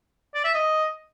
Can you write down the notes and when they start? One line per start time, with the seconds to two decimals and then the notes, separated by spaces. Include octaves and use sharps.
0.34 D5
0.44 E5
0.54 D#5